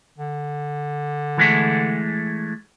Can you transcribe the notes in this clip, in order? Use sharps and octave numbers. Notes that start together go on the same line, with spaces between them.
D3
E3 G#3 A3